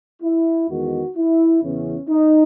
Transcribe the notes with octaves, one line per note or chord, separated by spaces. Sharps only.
E4
E2 D#3 G#3 B3 F#4
E4
E2 C#3 E3 B3 C#4
D#4